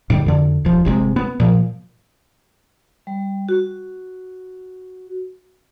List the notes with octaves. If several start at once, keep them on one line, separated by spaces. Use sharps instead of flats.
G#2 D3 D#3 G3
F2 D3
D#1 F3
G1 C3 D#3 G#3
B3
A#2 F3
G3
F#4